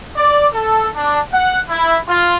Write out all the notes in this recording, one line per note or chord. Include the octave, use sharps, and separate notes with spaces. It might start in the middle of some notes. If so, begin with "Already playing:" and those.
D5
A4
D4
F#5
E4
F4